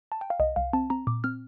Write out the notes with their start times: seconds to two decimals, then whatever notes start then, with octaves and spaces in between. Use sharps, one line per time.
0.12 A5
0.21 G5
0.30 F5
0.40 C2 D#5
0.56 C2 F5
0.73 C4 A5
0.90 C4 A#5
1.07 A#2 D6
1.24 C4 F6